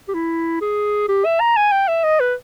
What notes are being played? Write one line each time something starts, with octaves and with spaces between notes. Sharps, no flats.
G4
E4
G#4
G4
E5
A#5
G#5
G5
E5
D#5
B4